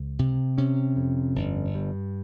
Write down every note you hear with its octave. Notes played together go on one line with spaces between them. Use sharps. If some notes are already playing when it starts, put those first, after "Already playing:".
Already playing: C#2
C3
C3 C#4
F2
G1
G2